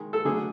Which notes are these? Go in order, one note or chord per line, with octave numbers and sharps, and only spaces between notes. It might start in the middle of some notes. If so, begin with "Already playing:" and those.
Already playing: D#3 G#3
A4
D3 F#3 A3 G#4